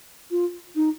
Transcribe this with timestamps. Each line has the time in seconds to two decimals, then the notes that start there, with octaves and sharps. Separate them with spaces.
0.31 F4
0.76 D#4